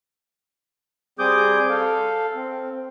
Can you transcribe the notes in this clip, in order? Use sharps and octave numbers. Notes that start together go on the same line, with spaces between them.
G3 C4 G#4 D6 D#6 G6
A4 F5
C4